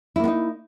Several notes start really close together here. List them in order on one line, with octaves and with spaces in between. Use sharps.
E4 A#3 B3 D#4